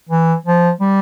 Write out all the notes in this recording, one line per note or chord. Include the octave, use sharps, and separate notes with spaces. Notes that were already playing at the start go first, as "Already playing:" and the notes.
E3
F3
G3